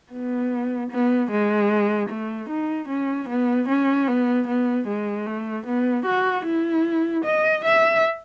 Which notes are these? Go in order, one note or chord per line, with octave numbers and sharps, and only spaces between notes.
B3
B3
G#3
A3
D#4
C#4
B3
C#4
B3
B3
G#3
A3
B3
F#4
E4
D#5
E5